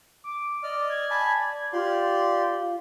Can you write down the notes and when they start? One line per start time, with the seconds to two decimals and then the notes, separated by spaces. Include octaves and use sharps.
0.24 D6
0.63 D5 D#5 F6
0.90 G#6
1.10 G#5 A5 B5
1.40 D5
1.73 F4 G4 D5 C6